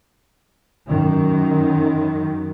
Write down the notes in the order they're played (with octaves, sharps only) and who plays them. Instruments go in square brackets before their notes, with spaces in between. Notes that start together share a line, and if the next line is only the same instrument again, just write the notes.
[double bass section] F#2 D#3